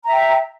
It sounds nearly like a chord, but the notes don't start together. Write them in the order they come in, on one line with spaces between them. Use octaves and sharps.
A#5 E5 G5